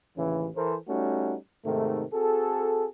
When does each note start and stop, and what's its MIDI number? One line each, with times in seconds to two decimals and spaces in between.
0.17 0.48 33
0.17 0.48 39
0.17 0.48 49
0.17 0.48 52
0.55 0.76 52
0.55 0.76 69
0.55 0.76 70
0.55 0.76 72
0.88 1.35 55
0.88 1.35 57
0.88 1.35 61
0.88 1.35 63
0.88 1.35 66
1.65 2.03 44
1.65 2.03 48
1.65 2.03 51
1.65 2.03 57
2.12 2.86 60
2.12 2.86 66
2.12 2.86 68
2.12 2.86 69